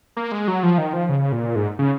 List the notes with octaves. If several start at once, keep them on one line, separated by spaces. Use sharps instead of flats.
A#3
G#3
F#3
F3
D#3
F3
C#3
A#2
G#2
C#3